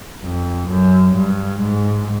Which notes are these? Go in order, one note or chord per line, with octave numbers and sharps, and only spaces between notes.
F2
F#2
G2
G#2